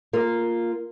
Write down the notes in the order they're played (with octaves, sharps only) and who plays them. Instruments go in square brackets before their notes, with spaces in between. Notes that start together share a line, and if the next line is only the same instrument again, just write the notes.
[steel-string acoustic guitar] A#3 F4